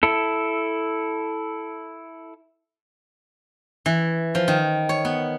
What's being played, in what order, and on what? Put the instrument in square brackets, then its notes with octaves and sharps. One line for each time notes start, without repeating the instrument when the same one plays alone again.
[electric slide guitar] E4 A4
[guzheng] E3
F3
D#3
C#5
B3